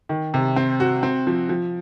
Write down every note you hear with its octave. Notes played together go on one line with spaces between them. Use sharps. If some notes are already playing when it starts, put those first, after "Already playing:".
D#3
C3
C4
F#4
C4
F3
F3